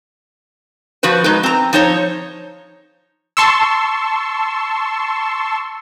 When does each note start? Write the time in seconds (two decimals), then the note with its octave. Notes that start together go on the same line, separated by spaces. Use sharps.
1.03 F3 F#4 B4 C5
1.24 G#3 D#4 B4
1.43 C4 A#5
1.73 F3 D#4 C5 C#5
3.37 A5 C6 C#6 E6